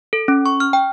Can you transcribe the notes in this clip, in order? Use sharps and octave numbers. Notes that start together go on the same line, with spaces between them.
A4
C#4
C#6
F6
G5